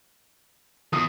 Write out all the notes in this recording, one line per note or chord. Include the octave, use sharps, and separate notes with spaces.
E2 D#6